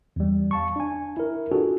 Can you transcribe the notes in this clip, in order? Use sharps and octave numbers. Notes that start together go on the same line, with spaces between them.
E2 G3
F5 A5 C#6
D4 G#5
E4 A#4
D4 F4 F#4 G#4 A4